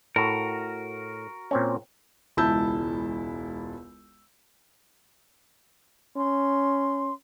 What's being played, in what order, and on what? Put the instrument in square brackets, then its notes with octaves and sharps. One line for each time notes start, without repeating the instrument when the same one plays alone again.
[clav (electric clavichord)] A2 [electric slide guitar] F#4 A#4
[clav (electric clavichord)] A#2 C4 C#4
[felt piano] E1 C#2 E4 A5 E6 G6
[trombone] C#4 [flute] C6